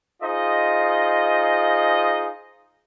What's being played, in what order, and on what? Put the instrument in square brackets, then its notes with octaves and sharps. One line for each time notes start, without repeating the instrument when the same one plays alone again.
[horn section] D#4 F4 G#4 C5 D#5